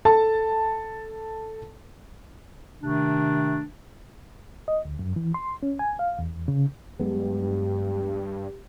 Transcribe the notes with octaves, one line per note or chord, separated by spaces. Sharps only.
A4 A5
C3 D#3 A3 D4
D#5
D2
F#2
E3
C6
C#4
G#5
F5
E2
C#3
G2 F#3 G#3 B3 G4